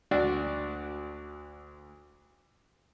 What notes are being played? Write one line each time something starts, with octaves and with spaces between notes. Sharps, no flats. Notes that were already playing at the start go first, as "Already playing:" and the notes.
D2 D4 F#4 D5